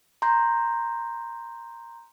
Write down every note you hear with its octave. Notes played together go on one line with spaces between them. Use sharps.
A#5 C6 G6